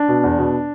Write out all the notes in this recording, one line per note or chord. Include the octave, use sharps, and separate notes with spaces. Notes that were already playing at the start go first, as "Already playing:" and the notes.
Already playing: D4
B2
E2
B2